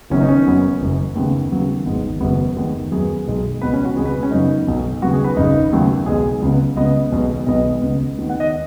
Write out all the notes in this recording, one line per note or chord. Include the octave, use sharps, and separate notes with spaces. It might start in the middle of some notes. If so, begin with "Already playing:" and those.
F#1 F#2 D#3 B3 C#4
D#4
C#4
F#2 F#3 B3
F#1 F#2 F#3
D#2 C#3 B3
D#2 C#3 F#3 B3
G#1 G#2 G#3 B3
F#1 F#2 F#3 B3
D#2 D#3 G#3 B3
F#2 F#3 B3 G#4
B1 B2 G#3
C#2 B2 B3 B4
C#4
F#4
C#2 B2 B3 G#4
B4
C#4
F#2 C#3 F#3 B3 D#4
B1 B2 F#3
D#2 C#3 F#3 B3 F#4
G#4
B4
G#1 F#2 C#3 G#3 D#4
D#2 C#3 F#3 B3
B1 B2 G#3 B3 G#4
C#2 C#3 B3
C#2 C#3 B3 D#5
B1 B2 G#3 B3
B1 B2 G#3 B3 D#5
C#2 C#3 B3
D#2 D#3 B3
F#5
D#5